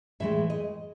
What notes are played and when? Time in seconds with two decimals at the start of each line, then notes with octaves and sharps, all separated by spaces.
0.20 A2 E3 G#3 E5
0.50 D#5